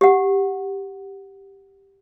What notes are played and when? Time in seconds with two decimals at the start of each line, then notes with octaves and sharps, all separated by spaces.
0.01 G4 F#5